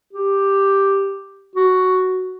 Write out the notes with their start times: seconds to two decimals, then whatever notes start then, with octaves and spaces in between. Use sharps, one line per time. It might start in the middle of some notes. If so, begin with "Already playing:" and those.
0.13 G4
1.56 F#4